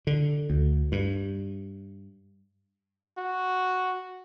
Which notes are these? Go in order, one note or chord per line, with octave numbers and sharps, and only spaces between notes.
D3
D2
G2
F#4